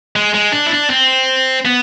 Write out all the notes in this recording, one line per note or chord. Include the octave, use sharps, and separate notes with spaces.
G#3
G#3
D4
E4
D4
C4
B3